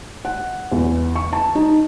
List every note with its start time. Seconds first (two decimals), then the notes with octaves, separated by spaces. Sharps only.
0.25 F#5
0.72 E2
1.15 C#6
1.33 A5
1.55 D#4